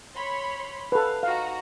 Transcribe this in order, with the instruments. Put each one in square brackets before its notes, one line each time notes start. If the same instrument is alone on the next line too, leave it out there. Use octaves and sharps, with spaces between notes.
[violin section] C#5 B5 C6
[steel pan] A4 B4 [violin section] F5
[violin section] D#4 F#4 A#5 [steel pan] F5